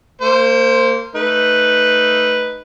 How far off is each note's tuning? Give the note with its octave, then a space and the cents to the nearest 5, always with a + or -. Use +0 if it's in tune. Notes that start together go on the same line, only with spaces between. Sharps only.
A#3 -30 C5 +0
A3 +0 D#4 +0 B4 +0